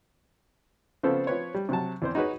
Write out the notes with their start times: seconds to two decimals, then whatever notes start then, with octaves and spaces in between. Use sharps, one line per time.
1.03 C#3 F3 B3 C4 A4 C5
1.27 F3 C4 B4 C#5
1.55 G3
1.69 C3 F#3 A5
2.02 E2 C4 C5
2.15 D#4 F#4 G#4 B4 C#5